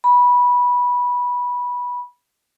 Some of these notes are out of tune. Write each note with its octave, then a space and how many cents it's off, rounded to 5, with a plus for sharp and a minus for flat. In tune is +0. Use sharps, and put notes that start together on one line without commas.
B5 -15